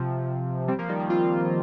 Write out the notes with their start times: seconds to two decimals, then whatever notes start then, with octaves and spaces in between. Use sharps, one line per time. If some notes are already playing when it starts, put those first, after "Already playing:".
Already playing: C3 F3
0.68 G3 C4
0.78 F3 A#3
0.89 D#3 G3
1.00 D#3 G3
1.10 C4 F4